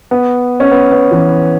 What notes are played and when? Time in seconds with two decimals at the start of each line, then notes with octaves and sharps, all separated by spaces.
0.11 B3
0.60 C#4
0.71 B3
0.92 B3
1.11 E3